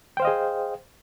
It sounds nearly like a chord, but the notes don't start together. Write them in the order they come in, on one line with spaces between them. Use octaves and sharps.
G5 C5 F5 D#5 G#4